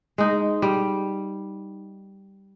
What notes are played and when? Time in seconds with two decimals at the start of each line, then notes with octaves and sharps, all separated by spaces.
0.18 G#3 D#4
0.62 G3